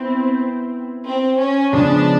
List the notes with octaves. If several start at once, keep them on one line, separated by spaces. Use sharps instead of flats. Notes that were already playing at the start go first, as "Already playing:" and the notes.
Already playing: B3 C4 E4
C4
C#4
C#3 F3 G#3 B3 D4